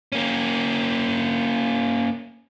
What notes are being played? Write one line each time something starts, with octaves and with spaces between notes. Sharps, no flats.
A#3 C#4